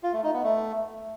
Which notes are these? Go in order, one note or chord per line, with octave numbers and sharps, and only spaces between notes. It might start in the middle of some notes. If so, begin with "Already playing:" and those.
F4
A3
D#4
B3
A3